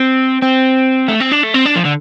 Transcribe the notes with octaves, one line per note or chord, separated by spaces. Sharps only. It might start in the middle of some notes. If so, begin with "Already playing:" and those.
Already playing: C4
C4
A3
C4
D4
A3
C4
D4
F3
D3